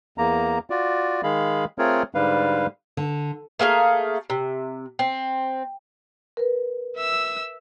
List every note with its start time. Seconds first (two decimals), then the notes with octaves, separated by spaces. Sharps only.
0.18 E2 A#3 A#5
0.70 F4 F#4 D5
1.23 D#3 G#3 G#4 F5 B5
1.78 A3 C4 F4 G#4 A#4 C#5
2.15 G#2 D3 G3 B4 F5
2.97 D3
3.59 A3 A#3 G#4 F5
4.30 C3
4.99 C4
6.37 A#4 B4
6.97 E5 E6